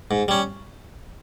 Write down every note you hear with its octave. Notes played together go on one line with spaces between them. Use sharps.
G#2
G3 C#4